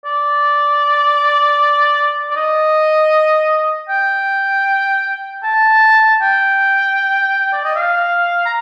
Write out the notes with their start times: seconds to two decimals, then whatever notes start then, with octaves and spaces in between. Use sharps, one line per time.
0.05 D5
2.31 D5
2.36 D#5
3.89 G5
5.43 A5
6.22 G5
7.53 D5
7.64 D#5
7.75 F5
8.46 A#5